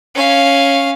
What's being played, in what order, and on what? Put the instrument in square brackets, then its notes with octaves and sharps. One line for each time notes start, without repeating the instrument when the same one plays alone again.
[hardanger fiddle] C#4 F5